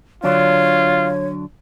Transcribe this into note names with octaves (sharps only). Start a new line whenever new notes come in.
D3 F#3 D4 F4 C#5